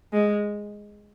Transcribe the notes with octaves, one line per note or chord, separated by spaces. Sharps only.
G#3